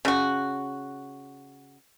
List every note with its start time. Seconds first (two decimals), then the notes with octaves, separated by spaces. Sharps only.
0.05 C#3 F#4